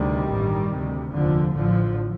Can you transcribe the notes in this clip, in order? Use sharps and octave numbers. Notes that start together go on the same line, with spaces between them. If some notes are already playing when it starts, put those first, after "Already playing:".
Already playing: D2 C3 D#3 G3
A1 G2
D2 C3
F1 D#2 D3 F3
A1 A2 D3 F3